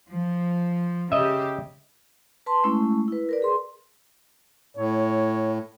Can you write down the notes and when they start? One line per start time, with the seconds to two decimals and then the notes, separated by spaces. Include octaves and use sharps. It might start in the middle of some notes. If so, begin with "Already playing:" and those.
0.10 F3
1.12 C#3 G4 D#5 E5
2.46 B4 A5 C6
2.64 G#3 A3 C#4 E4
3.08 E4 B4
3.29 A#4 B4 D5
3.42 G#4 C6
4.77 A2 C#5